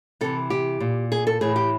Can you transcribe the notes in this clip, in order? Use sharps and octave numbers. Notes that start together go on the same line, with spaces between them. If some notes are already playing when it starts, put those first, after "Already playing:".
C3 E3 A4
G4
A#2
G#4
A4
A2 E3 G#4
G4